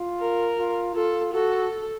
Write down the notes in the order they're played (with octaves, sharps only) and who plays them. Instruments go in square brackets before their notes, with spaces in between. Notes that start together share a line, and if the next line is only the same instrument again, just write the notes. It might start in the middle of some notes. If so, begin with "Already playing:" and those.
Already playing: [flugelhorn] F4
[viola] A#4
[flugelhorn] F4
[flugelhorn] F4 [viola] A4
[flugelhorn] F#4 [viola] A4